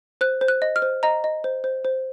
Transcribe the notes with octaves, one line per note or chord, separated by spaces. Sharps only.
C5 F#6
C5
F#6
D#5
F6
C5
D#5 A#5
D#5
C5
C5
C5